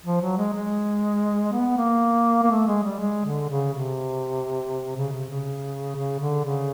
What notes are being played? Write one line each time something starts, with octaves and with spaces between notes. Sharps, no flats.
F3
F#3
G#3
G#3
B3
A#3
A#3
A3
G#3
G3
G#3
D3
C#3
C3
C#3
C3
C#3
C#3
D3
C#3